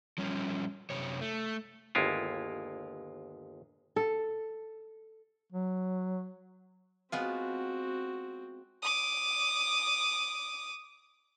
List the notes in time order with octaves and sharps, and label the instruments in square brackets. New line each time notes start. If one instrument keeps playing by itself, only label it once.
[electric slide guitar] F3 G3 C#4
F#2 C3 C#5
A3
[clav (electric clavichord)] G1 D#2 G#3 E4 F4
[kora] A4
[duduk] F#3
[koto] G#3 B3 F4 [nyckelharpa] C4 F#4
[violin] D6 D#6